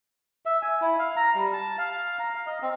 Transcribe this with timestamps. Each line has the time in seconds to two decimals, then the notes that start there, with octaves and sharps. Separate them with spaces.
0.45 E5
0.62 G#5
0.81 E4
0.99 F5
1.16 A#5
1.35 G3
1.53 A5
1.78 F5
2.19 A#5
2.35 F5
2.46 D#5
2.62 C4